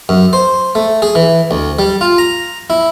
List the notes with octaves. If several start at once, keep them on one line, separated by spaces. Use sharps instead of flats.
F#2
C5
A3
G#4
E3
D2
G3
F4
A#5
E4